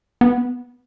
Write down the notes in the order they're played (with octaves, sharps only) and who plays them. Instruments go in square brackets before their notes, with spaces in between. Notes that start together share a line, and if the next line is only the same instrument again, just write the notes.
[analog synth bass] B3